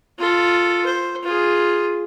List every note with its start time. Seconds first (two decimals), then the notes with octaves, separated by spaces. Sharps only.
0.18 F4 A4
0.85 C5
1.23 F4 G#4